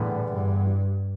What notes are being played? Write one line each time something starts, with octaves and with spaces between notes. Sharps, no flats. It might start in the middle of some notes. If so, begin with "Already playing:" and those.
Already playing: E2 A2 D3 G3 B3
G2